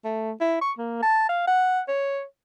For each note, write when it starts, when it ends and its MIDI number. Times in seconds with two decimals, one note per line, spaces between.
0.05 0.32 57
0.41 0.60 64
0.61 0.72 85
0.78 0.98 58
1.03 1.25 81
1.29 1.46 77
1.47 1.80 78
1.88 2.23 73